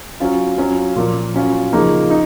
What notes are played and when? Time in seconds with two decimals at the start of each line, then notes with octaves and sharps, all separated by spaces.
0.20 F#3 C#4 F4
0.58 F#3 C#4 F4
0.96 A#2 F3 A#3
1.34 F#3 C#4 F4
1.73 C#3 F3 A#3 D#4
2.10 D#4